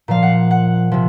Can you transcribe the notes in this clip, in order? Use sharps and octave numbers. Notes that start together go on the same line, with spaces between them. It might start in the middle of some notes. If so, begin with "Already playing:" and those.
A#2 F3 F5
F#5
F#5
C3 F3